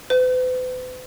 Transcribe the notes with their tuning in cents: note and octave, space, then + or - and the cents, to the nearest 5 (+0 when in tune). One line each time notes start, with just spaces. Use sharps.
B4 +45